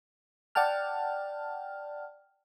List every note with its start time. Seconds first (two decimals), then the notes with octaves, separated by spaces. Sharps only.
0.55 D5 F#5 G5 A5 F6